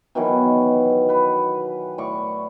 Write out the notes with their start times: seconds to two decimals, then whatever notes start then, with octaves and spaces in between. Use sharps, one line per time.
0.15 B2 D#3 E3 F#3
1.09 B4 F#5
1.98 A2 D5 C#6